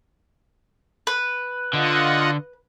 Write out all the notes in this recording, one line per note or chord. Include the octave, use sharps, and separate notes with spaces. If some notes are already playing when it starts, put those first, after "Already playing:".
B4
D3 F4 D#5 F#5